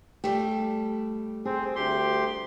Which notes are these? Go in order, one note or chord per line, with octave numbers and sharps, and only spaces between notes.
G3 A3 G4
C4 G#4
D2 G4 C6